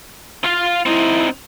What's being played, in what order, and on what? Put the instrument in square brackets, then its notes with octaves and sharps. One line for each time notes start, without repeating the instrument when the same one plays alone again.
[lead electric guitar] F4 F5
[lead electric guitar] C4 D#4 [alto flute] E4